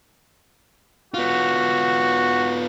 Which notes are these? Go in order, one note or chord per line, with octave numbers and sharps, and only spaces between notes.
B3 F4 F#4